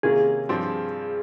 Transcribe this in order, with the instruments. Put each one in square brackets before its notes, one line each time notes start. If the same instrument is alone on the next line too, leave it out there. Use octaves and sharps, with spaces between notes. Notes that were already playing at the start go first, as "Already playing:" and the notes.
[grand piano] C3 D#3 A#3 C#4 F4 [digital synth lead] G#4
[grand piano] G2 F3 C4 G4